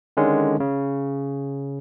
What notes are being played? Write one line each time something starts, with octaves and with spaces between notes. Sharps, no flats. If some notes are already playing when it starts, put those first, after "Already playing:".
D3 D#3 G#3 C#4
C#3